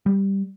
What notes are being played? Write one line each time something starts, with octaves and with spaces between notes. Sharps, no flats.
G3